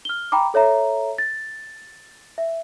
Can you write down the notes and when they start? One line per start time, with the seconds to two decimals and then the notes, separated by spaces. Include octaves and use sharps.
0.05 F6 G7
0.32 G5 A#5 B5 D6
0.54 A4 C#5 E5 A#5
1.18 A6
2.38 E5